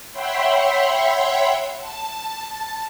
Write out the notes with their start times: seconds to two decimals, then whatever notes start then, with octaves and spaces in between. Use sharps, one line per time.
0.13 C#5 E5 F#5 G5 B5 C6
1.80 A5